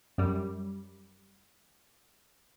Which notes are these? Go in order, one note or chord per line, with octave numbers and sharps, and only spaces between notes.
F#2 G3